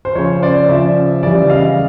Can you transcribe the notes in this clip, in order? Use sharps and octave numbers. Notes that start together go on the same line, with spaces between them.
C5
C#3 F3 C#5
C5 D5
C#3 F3 D5 E5
C#3 E3 G3 D5 E5
D#5 F5